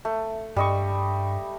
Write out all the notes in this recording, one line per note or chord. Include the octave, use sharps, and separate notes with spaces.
A3
G2 G3 D#5 C#6